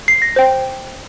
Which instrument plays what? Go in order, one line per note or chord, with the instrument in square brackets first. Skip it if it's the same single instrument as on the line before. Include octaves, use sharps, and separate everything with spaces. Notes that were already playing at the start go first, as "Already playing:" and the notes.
[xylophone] C7
A#6
C5 G5